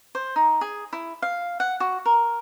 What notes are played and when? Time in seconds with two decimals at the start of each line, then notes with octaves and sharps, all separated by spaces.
0.15 C5
0.36 D#4
0.61 G#4
0.93 E4
1.22 F5
1.60 F#5
1.80 F#4
2.06 A#4